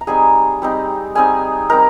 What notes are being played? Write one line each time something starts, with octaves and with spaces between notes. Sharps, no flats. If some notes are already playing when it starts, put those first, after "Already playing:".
A#5
G3 C4 D#4 G#4 G#5
G3 C4 D#4
G3 C4 D#4 G#4 G#5
G3 C4 D#4 A#4 A#5